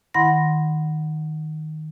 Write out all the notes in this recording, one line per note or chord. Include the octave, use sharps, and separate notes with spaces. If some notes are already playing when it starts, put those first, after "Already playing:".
D#3 E4 F#5 B5 C6 A#6